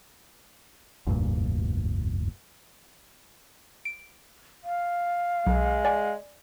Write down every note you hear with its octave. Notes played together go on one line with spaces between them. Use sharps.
F1 D2 G2 A#2
D7
F5
B1 G#3
D5 G#5